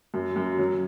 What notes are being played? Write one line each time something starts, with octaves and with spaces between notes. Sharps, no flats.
F#2
F#2
F#3